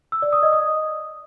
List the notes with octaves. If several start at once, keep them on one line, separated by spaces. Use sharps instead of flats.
E6
D5
D#6
D#5
D#6